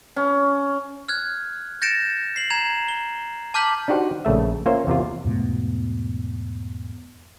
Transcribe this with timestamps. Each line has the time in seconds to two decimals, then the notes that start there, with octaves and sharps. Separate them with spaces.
0.16 C#4
1.08 F6 F#6 G#6
1.82 G6 A6 A#6 C#7 D7 E7
2.36 C7 F#7
2.50 A#5 G#6 E7 F7
2.88 G7
3.54 A5 D6 F6 G6 B6 F#7
3.88 D4 D#4 F#4 G4 C5 F#5
4.25 A#1 C#3 A3 E5
4.66 A#3 C#4 F4 C5 C#5 E5
4.87 E2 C3 F4
5.24 E2 G#2 B2 A3